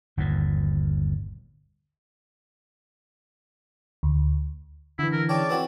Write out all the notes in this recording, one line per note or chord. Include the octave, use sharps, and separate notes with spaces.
G1 D#2 A#2
D2
D3 E3 E4
A#4
C#3 C#5 D5 G5 A5 D6
E3 C4 F#4